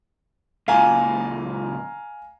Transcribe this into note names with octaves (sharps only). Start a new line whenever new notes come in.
C#2 A#2 F5 G#5 A#5